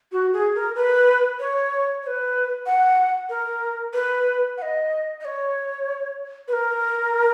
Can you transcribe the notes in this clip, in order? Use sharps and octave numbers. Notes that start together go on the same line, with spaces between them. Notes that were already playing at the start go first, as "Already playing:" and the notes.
F#4
G#4
A#4
B4
C#5
C#5
B4
F#5
A#4
B4
F#5
D#5
D#5
C#5
B4
A#4